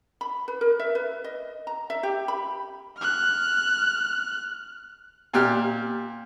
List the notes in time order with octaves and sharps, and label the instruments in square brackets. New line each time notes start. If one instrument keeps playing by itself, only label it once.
[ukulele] B5
B4
A#4
E5
B4
D#5
A#5
E5
G4
B5
[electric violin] F6 F#6
[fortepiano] A#2 G4 F6